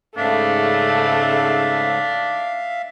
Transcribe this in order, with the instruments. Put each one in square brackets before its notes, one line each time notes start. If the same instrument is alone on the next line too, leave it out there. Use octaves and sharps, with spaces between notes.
[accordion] G#2 C#3 [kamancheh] A3 [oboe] D4 [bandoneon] E5 F5